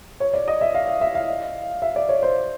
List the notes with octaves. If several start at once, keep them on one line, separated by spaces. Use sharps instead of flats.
C#5
D5
D#5
E5
F5
E5
E5
F5
E5
D5
C#5
C5